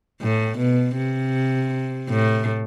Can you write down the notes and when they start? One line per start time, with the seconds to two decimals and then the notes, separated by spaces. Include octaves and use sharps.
0.22 A2
0.58 B2
0.97 C3
2.09 A2